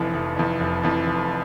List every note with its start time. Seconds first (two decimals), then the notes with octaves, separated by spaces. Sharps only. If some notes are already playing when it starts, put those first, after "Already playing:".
Already playing: F1 F2 E3
0.14 F1
0.37 F2 E3
0.60 F1
0.83 F2 E3
1.06 F1